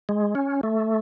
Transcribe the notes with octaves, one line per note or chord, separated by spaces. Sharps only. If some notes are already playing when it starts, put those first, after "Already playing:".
G#3
C#4
A3